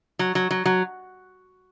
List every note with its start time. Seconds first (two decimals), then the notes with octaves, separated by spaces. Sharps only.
0.19 F#3
0.35 F#3
0.51 F#3
0.65 F#3